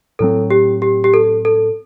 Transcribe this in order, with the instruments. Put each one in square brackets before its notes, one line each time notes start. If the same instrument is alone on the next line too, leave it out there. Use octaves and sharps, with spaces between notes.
[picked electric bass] A2 F#3 C4 [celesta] A4
[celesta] G4
G4
G4
A4
A4